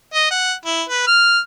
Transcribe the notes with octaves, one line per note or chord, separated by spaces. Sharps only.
D#5
F#5
E4
B4
F6